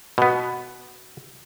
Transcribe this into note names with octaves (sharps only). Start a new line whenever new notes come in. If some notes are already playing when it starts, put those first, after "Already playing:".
B2 B3